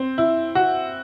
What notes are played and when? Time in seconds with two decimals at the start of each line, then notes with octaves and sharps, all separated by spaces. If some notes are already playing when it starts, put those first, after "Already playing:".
Already playing: C4
0.18 E4
0.55 F#4